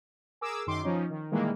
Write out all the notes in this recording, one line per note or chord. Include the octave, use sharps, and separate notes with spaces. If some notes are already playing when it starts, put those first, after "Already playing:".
G#4 A#4 D6 E6
F#2 D#3 C6 D6
F3 C#4 D#4
D#3
A#2 D#3 E3 G3 G#3 A#3